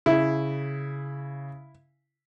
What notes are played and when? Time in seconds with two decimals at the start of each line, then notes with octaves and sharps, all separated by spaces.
0.06 C#3 E4